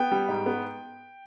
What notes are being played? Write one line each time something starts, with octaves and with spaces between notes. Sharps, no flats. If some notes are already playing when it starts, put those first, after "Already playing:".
Already playing: B3 G5
G3
G#2
B3